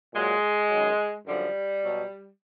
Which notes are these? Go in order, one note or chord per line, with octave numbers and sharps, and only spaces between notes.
A#2 F#3 G#3
F#2 D#3 F#3
F#2 D3 F3 G3
B2 F#3